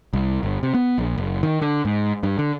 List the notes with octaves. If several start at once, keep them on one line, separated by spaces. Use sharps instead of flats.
C2
G1
C3
B3
A#1
F#1
D#3
D3
G#2
G2
D3